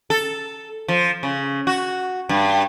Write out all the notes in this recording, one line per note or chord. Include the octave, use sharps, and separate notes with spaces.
A4
F3
C#3
F#4
G2